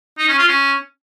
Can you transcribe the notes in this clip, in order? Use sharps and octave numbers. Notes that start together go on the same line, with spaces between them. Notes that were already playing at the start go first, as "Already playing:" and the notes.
D#4
C#4
F4
C#4